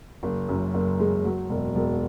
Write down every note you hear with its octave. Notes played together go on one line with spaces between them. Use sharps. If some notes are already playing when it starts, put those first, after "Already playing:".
F#1
F#2
F#1
G#3
F#3
E1
E1